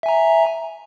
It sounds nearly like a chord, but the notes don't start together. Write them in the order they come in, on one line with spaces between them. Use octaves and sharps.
E5 G#5 A#5